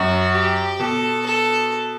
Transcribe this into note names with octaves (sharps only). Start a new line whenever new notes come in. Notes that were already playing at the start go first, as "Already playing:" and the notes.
Already playing: F#2 F#4
G4
B2 A4
A4